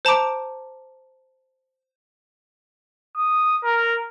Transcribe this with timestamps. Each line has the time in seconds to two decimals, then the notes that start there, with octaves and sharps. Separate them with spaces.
0.05 C5 A5 A#5 D6 D7
3.18 D#6
3.64 A#4